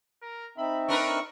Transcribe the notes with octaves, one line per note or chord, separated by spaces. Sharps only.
A#4
C4 D#4 E5 B5
D4 A#4 B4 C#6